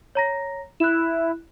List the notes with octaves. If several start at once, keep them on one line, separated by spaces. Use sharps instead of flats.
C#5 A#5 A#6
E4 F#6 E7